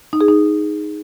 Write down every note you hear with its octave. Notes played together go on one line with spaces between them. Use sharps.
D#4
G#4
D#4